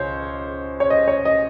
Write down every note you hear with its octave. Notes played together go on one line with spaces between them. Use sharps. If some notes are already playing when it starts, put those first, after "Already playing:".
Already playing: C#2 C5 C#5
C#5
D#5
C#5
D#5